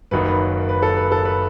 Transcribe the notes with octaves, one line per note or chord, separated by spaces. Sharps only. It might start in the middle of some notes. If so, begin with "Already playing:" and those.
F#1 F#2 D#3 B4
B4
B4
A4
B4
A4
B4